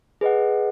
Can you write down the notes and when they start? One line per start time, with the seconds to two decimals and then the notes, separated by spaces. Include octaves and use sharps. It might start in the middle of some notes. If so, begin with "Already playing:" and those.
0.21 G#4 B4 D#5 F#5